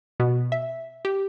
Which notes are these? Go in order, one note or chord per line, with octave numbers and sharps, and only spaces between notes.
B2
E5
G4